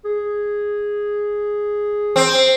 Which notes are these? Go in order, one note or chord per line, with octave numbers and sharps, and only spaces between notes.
G#4
C4